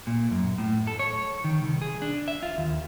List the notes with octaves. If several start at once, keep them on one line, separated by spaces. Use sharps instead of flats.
A#2
F#2
A2
A4
C#5
D#3
C2
G#4
D4
E5
F4
D#2